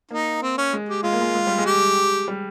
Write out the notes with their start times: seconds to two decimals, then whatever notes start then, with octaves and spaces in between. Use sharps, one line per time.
0.11 A#3 D#4
0.42 C4
0.58 C#4
0.73 G#3
0.89 G4
1.03 G#3 F4
1.13 A#3
1.22 G#3
1.35 G#3
1.47 G3
1.58 G#3
1.66 G4
2.28 G3